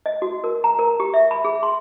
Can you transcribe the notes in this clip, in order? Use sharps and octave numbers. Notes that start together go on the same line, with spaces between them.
D#5
F#4
A#4
A#5
A#4
G4
E5
B5
G#4
C6